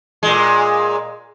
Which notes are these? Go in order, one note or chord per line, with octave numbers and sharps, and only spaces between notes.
A#2 G#3